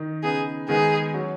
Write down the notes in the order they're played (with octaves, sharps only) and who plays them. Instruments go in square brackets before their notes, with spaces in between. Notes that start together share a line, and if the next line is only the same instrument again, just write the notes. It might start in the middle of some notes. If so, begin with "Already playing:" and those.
Already playing: [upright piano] D#3 D#4
[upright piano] C#3 B3 D#4 [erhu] G#4
[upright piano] D#3 G#3 B3 D#4 [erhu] G#4
[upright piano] F#3 C#4